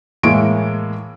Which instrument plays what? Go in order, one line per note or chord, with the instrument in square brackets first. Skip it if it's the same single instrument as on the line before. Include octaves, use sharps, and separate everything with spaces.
[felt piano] A2 E3 G#3 A#3 C#6 D7